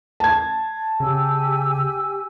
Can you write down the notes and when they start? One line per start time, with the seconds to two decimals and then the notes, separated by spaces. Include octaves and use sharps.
0.20 A5 G#6
1.00 C#3 G4 G#5 E6